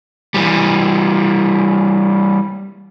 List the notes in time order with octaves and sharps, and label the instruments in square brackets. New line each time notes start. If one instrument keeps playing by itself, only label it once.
[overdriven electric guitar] E3 G3